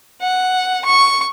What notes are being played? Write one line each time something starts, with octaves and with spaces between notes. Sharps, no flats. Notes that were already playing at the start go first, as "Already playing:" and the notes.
F#5
C#6